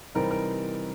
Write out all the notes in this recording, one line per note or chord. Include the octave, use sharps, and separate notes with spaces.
C3 E3 G3 C4 D#4 A#4
A#4